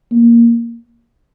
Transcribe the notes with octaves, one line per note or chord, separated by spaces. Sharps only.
A#3